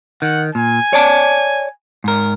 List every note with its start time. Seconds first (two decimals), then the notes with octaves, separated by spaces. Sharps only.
0.22 D#3 F#5
0.55 A#2 G#5
0.93 C#5 D5 A5
2.04 G#2 A#4